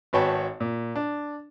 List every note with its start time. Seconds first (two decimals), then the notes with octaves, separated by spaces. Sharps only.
0.13 G#1 F#4 B4 C#5 G5 A5
0.60 A#2
0.96 D4